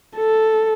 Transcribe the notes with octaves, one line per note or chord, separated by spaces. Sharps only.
A4